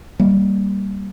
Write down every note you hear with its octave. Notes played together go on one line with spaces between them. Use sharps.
G3 A#3